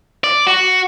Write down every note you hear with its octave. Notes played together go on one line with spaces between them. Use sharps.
D5
F#4